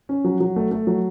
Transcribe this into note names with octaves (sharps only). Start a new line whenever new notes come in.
C#4
F#3
F#3
A3
A3
F#3